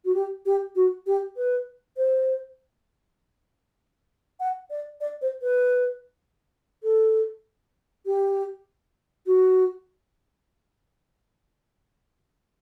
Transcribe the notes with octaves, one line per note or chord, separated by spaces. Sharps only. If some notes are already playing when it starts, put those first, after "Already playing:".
F#4
G4
G4
F#4
G4
B4
C5
F#5
D5
D5
C5
B4
A4
G4
F#4